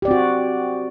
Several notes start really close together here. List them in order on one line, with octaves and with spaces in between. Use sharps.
G4 D5 C4 F#4